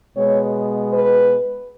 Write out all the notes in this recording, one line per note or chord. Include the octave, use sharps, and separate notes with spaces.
B2 G#3 B3 C#5
B4